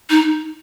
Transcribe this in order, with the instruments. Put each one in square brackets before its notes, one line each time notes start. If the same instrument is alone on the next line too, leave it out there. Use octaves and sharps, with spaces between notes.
[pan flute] D#4